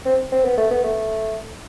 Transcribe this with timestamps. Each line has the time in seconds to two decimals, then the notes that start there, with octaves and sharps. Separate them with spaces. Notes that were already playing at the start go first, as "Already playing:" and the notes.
0.06 C4
0.32 C4
0.45 B3
0.58 A3
0.71 B3
0.84 A3